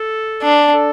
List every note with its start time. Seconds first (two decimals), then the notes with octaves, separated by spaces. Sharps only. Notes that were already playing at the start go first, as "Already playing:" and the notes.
Already playing: A4
0.42 D4
0.74 A4